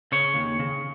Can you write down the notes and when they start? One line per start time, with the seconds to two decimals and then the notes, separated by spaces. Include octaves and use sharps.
0.12 C#3 C#5
0.35 D#2
0.59 C#3